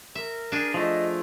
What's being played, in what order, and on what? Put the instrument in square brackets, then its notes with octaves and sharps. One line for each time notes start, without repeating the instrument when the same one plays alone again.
[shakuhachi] A#4 [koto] E5
[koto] D4 G#4
[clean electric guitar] F3 A3 [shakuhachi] D#5